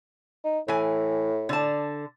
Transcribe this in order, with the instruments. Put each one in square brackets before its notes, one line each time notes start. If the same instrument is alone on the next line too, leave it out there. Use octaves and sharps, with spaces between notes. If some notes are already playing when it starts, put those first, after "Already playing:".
[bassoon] D#4
[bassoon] A2 [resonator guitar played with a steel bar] E3 G#5
[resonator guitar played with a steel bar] D3 A5